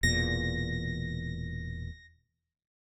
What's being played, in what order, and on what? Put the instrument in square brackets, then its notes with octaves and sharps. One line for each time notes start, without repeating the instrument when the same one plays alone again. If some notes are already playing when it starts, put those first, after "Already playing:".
[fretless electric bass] E1 E2 A#2 [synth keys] A#6